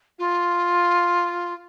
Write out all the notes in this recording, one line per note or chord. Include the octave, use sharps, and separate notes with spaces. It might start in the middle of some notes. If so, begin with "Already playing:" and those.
F4